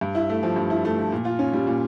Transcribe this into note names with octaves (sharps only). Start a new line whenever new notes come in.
G2
E4
A3
F3
G2
E4
A3
F3
A#2
F4
C#4
G3
A#2